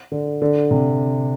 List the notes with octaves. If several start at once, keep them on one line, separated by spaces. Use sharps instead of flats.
D3
D3
C3